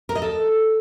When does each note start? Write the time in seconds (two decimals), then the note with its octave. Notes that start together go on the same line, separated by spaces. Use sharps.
0.09 A#4
0.15 D#5
0.22 A4